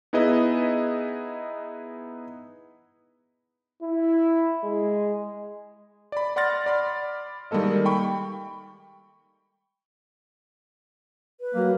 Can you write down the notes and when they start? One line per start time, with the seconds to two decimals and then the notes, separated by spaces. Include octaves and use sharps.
0.13 B3 D#4 E4 G#4 B4 D#5
3.82 E4
4.64 G#3
6.12 D5 B5
6.36 D5 F#5 C6 F6 A6 A#6
6.66 D5 B5 C6
7.51 D#3 G3 G#3 A#3 A4 D#5
7.86 G5 B5 C#6
11.41 B4
11.54 F#3 A#3